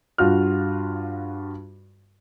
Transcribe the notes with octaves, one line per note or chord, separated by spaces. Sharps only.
G2 F4 F#4 F6